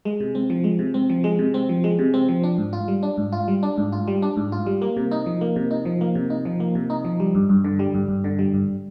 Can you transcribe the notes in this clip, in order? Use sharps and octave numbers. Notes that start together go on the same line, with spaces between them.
G#3
C3
C4
F3
G#3
C3
C4
F3
G#3
C3
C4
F3
G#3
C3
C4
F3
D4
G#2
F4
G3
D4
G#2
F4
G3
D4
G#2
F4
G3
D4
G#2
F4
G3
A#3
C3
D#4
F3
A#3
C3
D#4
F3
A#3
C3
D#4
F3
A#3
C3
D#4
F3
G3
G2
G2
D3
G3
G2
G2
D3
G3
G2